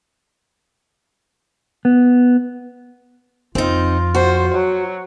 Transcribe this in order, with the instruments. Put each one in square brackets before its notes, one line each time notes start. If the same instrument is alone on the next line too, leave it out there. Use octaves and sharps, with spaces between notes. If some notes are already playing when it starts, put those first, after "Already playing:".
[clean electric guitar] B3
[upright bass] F2 [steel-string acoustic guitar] C4 D#4 [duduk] F4
[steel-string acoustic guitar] F#4 [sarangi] C5
[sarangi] F#3